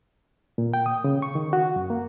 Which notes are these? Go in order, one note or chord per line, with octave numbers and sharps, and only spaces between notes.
A#2
G5
D#6
C#3
C#6
D#3
F#4
F#2
A#3